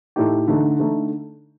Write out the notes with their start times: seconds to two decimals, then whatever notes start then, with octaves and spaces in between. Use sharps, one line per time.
0.16 A2 A3 D#4 G4
0.47 D3 A3 D#4
0.79 D3 A3 D#4